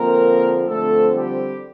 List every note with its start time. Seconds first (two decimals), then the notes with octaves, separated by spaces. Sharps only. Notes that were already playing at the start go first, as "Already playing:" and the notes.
Already playing: D3 F3 A#3 C4 A#4
0.68 D3 F3 A3 C4 A4
1.14 G3 G4